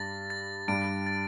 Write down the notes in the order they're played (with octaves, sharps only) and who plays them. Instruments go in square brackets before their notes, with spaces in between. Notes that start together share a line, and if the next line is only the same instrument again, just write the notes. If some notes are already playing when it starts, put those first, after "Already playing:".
Already playing: [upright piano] G2 G3 [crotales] A6 A#6
[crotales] A6
[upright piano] G2 G3 [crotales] D7
[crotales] A6